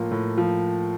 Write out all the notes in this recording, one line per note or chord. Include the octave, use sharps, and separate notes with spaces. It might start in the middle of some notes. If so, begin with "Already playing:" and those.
Already playing: A2 F3 A#3 F4
A2
F3